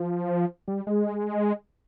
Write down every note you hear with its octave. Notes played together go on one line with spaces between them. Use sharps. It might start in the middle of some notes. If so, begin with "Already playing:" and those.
Already playing: F3
G3
G#3